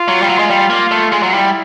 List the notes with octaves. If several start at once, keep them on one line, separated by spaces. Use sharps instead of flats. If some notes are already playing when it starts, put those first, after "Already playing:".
Already playing: F4
F#3
G3
F#3
G#3
G3
A#3
A3
G#3
F#3
G3 E4